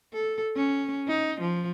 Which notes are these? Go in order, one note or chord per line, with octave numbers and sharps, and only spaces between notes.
A4
C#4
D#4
F3